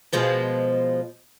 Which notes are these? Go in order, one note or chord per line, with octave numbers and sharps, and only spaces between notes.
B2 F3 G#3